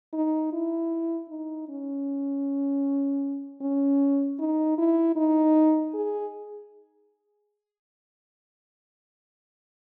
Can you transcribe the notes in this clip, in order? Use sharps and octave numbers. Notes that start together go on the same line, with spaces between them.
D#4
E4
D#4
C#4
C#4
D#4
E4
D#4
G#4